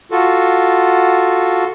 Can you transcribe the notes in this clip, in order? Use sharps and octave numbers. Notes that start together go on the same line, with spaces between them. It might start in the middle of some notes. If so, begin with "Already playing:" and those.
F4 F#4 A4